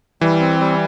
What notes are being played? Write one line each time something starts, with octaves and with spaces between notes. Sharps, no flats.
E3 G3
C4
G3